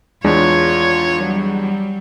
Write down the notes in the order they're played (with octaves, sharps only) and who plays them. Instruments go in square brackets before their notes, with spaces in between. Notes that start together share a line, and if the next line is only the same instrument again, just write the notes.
[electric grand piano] E2 G#3 D4 [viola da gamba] F4 C#5
[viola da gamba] F#3 G3